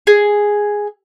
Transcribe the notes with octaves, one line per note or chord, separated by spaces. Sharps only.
G#4